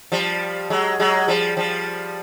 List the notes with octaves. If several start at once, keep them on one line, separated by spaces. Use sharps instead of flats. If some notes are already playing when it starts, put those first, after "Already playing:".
F3 G3
F#3 G#3
F#3 G#3
F3 G3
F3 G3